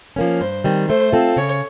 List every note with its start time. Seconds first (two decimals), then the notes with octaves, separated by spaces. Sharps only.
0.16 F3 A#3 C#4
0.41 G2 C5
0.64 D#3 G3 C4
0.89 A3 C5
1.13 C4 F4 A4
1.36 C#3 C#5